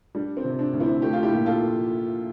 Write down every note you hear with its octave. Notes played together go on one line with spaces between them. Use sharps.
G3 D4
C4
C3
D4
D2
C4 E4
A3 G4
F4
E4 G4
A#2
F4 A4